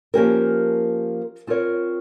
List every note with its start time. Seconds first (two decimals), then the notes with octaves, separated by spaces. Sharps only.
0.14 F3 A#3 C#4 G4 A#4
1.47 C4 F4 A#4 C#5